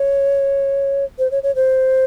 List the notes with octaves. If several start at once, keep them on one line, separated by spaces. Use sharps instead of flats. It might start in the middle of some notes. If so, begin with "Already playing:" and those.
Already playing: C#5
C5
C#5
C#5
C5